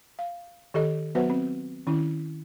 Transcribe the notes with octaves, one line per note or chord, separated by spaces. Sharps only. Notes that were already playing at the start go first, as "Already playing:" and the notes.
F5
D#3 G4 A4 D#5
F#3 B3 F#4 B4 C5 F#5
C4
D#3 C#4 E4